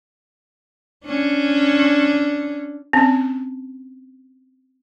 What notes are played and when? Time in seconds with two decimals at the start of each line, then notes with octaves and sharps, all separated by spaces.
1.04 C#4 D4
2.93 C4 C#4